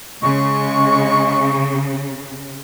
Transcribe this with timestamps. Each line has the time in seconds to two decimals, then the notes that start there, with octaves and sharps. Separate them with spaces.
0.22 C#3 G#3 C#6